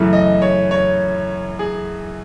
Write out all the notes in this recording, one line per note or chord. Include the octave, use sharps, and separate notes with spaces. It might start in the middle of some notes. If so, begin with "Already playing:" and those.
Already playing: F#2 C#3 E3 A3
D#5
C#5
C#5
G#4